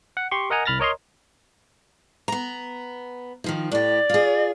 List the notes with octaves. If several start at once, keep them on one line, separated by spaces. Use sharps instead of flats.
F#5
G4 C6 C#6
A#4 D#5 F#5 G#5 A#5
C2 B5 F6 A6 A#6
A#4 C#5 D#5 A#5 C6
B3 A#5
D#3 F3 D#4
A2 G4 D5
F4 G#4